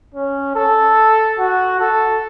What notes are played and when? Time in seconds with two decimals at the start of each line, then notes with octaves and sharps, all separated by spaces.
0.14 C#4
0.56 A4
1.39 F#4
1.80 A4